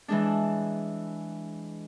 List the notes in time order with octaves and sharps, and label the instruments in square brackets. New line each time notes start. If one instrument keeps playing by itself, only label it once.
[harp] E3 G#3 D4